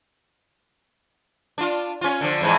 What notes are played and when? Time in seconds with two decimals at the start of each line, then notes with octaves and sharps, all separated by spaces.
1.58 D4 F4
2.01 C#4 F4
2.21 D3 F3
2.41 F2 G#2 E3